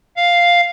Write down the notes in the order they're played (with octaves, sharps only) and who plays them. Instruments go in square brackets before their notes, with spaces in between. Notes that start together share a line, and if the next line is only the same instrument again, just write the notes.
[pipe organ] F5